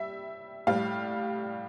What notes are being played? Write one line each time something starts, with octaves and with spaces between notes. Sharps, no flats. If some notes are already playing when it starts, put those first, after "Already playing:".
Already playing: G3 E5
A2 G3 F5